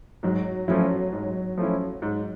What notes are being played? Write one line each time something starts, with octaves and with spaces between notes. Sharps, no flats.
G#2 F#3
F3 F#3 A3 C#4 E4
G#2
F3 A3 C#4 E4
G#2